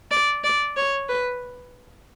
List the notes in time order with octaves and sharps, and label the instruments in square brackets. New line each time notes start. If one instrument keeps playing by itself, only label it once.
[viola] D5
D5
C#5
B4